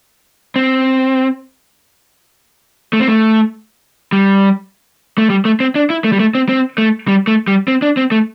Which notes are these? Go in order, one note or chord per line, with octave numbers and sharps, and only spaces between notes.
C4
A3
C4
A3
G3
A3
G3
A3
C4
D4
E4
A3
G3
A3
C4
C4
A3
G3
A3
G3
C4
D4
C4
A3